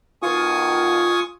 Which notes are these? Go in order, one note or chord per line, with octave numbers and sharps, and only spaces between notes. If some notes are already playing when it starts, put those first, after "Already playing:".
B2 D#3 F4 G#5 C#6 D#6